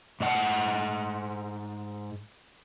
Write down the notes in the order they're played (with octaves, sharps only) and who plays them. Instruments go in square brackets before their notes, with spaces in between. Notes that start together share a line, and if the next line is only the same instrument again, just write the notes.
[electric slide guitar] G#2 D#5 F#5